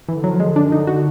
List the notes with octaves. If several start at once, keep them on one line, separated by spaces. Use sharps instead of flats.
D3 E3
F3 F#3
D3 G#3
F#2 D4
D3 D#4
D3 F#4